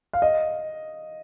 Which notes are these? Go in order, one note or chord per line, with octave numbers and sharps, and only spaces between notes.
F5
D#5